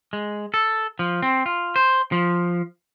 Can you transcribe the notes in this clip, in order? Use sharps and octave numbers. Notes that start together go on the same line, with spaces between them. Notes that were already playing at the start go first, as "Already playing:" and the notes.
G#3
A4
F3
C4
F4
C5
F3